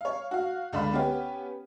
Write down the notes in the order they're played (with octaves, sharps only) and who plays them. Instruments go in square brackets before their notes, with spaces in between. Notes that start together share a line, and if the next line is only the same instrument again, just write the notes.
[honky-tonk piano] C#5 F5
F#4 F5
C#2 D3 D5 F5 B5
B3 C#4 G4 B4